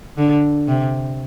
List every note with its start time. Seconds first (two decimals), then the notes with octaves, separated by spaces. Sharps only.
0.18 D3
0.68 C3